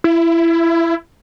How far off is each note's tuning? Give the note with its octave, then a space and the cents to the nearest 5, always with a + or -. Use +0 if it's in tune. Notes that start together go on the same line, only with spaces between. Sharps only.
E4 +20